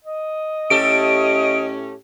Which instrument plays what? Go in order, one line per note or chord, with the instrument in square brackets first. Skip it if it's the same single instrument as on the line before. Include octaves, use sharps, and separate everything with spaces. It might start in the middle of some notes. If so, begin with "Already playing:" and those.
[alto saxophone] D#5
[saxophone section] A2 A3 C#4 [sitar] G4 A4 [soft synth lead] D7